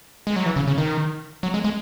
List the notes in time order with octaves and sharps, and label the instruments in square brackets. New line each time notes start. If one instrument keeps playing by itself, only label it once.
[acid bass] G#3
F#3
E3
C#3
C#3
D#3
F#3
G#3
G#3